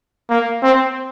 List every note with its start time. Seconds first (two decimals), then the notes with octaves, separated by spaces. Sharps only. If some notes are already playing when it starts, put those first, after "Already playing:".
0.30 A#3
0.63 C4